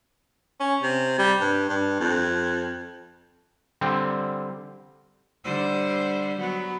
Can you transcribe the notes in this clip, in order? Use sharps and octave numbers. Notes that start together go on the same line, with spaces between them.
C#4
C3
G3
G2
G2
F2
D3 G3 C4
D3 G3 C5
F#3 B3